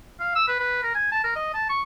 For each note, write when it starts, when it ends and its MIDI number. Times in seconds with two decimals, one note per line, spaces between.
0.20 0.32 77
0.36 0.45 88
0.48 0.59 71
0.60 0.83 71
0.83 0.92 70
0.95 1.09 80
1.12 1.22 81
1.24 1.34 70
1.36 1.50 75
1.54 1.67 81
1.70 1.82 85